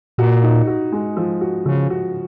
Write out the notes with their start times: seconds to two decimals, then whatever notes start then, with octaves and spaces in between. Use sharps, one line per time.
0.18 A#2 F#4
0.43 D#4
0.67 F#4
0.92 G#3
1.17 F3
1.41 F#4
1.66 C#3 F3
1.90 F#4